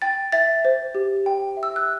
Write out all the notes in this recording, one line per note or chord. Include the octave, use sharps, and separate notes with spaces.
G5 A6
E5 A6
C5
G4
G5
E5
E6
F#6